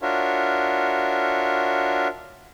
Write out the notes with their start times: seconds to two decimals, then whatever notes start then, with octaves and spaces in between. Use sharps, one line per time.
0.02 D4 F4 F#4 A#4 C#5 E5